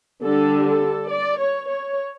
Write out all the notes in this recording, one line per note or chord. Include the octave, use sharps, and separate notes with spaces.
D3 G3 D4 A4
A4
D5
C#5
C#5